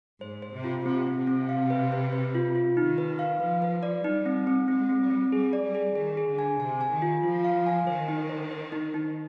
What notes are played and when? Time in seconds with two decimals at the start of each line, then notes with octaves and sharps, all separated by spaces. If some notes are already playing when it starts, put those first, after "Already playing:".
0.21 G#2 C5
0.42 C5
0.54 C3
0.64 F4
0.85 C3 C4
1.07 C4
1.17 C3
1.27 C4
1.49 F5
1.70 B4
1.92 B4
2.13 B4
2.35 F4
2.56 F4
2.77 D#3 D#4
2.98 B4
3.19 F5
3.40 F3 B4
3.62 B4
3.83 D5
4.04 G3 D#4
4.26 C4
4.47 C4
4.68 G#3 C4
4.89 C4
5.00 G3
5.10 C4
5.32 G3 G#4
5.53 D5
5.65 G3
5.75 G#4
5.95 D#3 G#4
6.17 G#4
6.27 D3
6.39 G#5
6.60 C3 G#5
6.81 G#5
6.91 D#3
7.02 F4
7.23 F3 F4
7.44 F5
7.66 G#5
7.87 D#3 C5
8.08 D#4
8.29 C5
8.51 C5
8.72 D#4
8.94 D#4